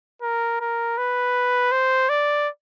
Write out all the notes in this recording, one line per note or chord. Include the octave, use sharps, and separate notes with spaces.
A#4
A#4
B4
C5
D5